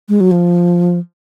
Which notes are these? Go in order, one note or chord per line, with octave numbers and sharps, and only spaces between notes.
G#3
F#3
F3